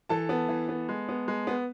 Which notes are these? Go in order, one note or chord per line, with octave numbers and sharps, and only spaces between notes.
E3 A4 A5
B3
E3
B3
G#3
B3
G#3
B3